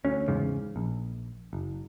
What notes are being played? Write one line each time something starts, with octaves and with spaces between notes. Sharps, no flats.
D2 C#4
E2 G#2 C#3
A#1
F#1